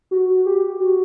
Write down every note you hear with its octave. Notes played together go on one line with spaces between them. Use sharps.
F#4
G4
F#4